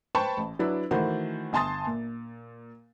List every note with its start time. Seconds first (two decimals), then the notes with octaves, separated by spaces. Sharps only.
0.15 B4 C5 G5 A5 B5 C#6
0.37 A1
0.59 F#3 D4 E4 B4
0.91 D#3 E3 A3 F#4 C5
1.53 G1 G#5 A5 C6 D#6 A6
1.87 A#2